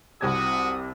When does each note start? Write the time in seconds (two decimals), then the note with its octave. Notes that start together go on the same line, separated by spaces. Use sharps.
0.21 C2 C3 F#4 D#6 G#6